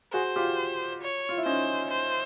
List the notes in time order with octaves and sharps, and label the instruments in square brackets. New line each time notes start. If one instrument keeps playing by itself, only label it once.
[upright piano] F#4 G#4 [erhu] C5
[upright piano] F4 G4
[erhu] C#5
[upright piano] F4
E4
[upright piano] C#4 D#4 [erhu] C5
[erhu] C5